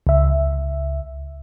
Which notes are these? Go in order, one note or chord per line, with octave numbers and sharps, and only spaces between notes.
C#2 E5